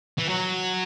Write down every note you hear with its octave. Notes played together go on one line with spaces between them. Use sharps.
E3
F#3